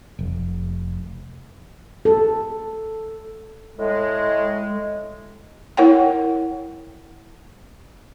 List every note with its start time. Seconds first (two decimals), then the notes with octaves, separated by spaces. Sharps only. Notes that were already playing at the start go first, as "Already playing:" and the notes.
0.19 F1
2.05 A4
3.79 A2 G#3
5.77 E4 A#4 C#5 F#5 G5